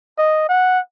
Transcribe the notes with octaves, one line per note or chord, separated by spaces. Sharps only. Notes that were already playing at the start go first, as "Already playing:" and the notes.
D#5
F#5